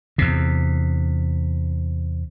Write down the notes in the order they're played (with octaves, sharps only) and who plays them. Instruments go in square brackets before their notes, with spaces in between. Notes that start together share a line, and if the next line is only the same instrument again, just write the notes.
[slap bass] E2 C3